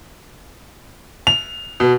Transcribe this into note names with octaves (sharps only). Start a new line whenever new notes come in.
F7
B2